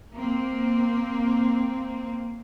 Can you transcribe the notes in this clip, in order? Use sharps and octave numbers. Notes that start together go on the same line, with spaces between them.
A#3 C4